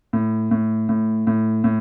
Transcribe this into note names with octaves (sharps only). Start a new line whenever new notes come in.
A2
A2
A2
A2
A2